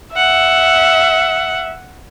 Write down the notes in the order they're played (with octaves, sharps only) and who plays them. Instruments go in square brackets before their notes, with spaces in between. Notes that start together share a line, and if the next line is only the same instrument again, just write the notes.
[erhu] E5 [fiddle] F#5